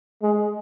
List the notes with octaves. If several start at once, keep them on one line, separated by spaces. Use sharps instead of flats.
G#3